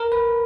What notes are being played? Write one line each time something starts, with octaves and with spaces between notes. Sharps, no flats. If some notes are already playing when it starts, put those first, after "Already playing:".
Already playing: A#4
B4